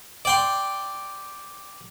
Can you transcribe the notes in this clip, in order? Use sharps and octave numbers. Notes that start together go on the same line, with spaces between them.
D5 G5 C6